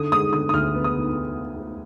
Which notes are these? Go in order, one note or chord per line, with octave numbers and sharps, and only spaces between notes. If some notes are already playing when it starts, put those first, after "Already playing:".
Already playing: D3 D#6
G#3 D#6
D3 D#6
D#6
D2 F6
B3
D#6
D3